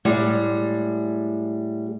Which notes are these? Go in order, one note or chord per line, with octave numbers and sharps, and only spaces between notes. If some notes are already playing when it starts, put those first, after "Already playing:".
A2 G3 G#3